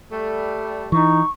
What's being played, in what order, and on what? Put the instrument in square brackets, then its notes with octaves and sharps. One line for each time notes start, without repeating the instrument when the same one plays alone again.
[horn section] G3 A3
[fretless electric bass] E3 [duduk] D#4 [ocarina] C#6